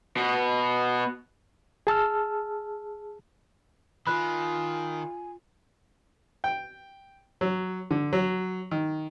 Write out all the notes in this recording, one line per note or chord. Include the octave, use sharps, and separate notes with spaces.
B2 B3
G#4 A5 E6 F6
D#3 F4 G#5 B5 F#6
G5
F#3
D3
F#3
D#3